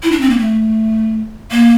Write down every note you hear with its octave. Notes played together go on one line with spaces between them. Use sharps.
E4
D4
C4
A#3
A3
A#3